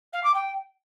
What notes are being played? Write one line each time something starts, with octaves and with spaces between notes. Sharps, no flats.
F5
D6
G5